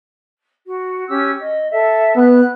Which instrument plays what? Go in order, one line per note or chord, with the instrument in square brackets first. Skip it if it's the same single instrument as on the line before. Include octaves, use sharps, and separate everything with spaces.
[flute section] F#4
C#4 G4 E6
D#5
A4 E5
[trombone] B3 [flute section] F#6